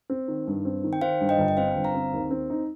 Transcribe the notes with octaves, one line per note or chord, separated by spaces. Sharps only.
C4
D#3
G2
C4
D#3
G5
D#3 C5 F5
G2
D#5 G5
G1
G5
C4 C5 F5
G1
F5 A#5
C4
D#2
C4
D#4